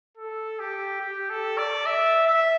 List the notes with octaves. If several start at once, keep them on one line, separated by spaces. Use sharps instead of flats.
A4
G4
G4
A4
D5
E5
E5